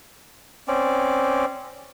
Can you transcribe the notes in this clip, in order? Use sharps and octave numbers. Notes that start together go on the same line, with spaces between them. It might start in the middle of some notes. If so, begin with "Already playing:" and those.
C4 C#4 D5